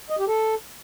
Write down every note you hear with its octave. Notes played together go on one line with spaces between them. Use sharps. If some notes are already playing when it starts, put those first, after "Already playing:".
D#5
G4
A4